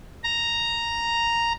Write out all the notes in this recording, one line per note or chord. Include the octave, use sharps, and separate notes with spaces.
A#5